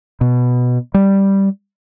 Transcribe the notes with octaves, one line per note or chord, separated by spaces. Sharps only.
B2
G3